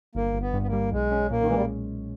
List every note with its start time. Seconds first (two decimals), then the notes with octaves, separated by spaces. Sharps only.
0.15 G1 A#3
0.34 G1
0.41 B3
0.54 G2
0.62 B3
0.67 A#3
0.73 G3
0.92 B1 G#3
1.12 C#4
1.31 A#2 A#3
1.40 D#3
1.48 E3
1.50 G3 G#3